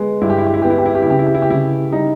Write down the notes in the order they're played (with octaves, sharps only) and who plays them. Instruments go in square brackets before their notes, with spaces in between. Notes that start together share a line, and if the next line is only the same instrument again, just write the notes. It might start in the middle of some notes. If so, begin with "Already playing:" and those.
Already playing: [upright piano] G#3 B3
G2 E4
G4
E4
G4
E4
B3 G4
E4
G4
E4
G4
E4
C#3 G4
E4
G4
E4
G4
C#3 E4
G3 D#4